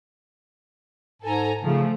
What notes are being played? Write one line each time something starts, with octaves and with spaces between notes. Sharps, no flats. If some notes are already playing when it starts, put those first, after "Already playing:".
G#2 A4 G#5 A#5
C#3 F3 A3